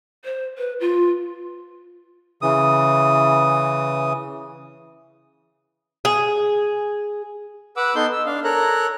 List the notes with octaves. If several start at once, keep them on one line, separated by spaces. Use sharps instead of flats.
C5
B4
F4
C#3 E3 D#6
G#4
B4 F#5 D6 E6
B3 D#4 A4 C6 G6
E6
D4 F5
A4 A#4 C#5 A#5 F#6